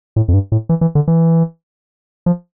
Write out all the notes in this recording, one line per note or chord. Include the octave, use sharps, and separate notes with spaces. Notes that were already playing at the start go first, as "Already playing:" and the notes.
A2
F2
G2
A2
E3
E3
D3
E3
F3